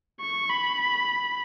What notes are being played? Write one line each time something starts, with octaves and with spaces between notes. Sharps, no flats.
C#6
B5